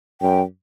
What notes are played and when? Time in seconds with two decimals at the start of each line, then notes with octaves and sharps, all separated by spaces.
0.21 F#2 G5